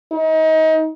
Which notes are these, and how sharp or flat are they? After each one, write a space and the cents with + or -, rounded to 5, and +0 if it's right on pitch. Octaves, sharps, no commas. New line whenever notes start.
D#4 +30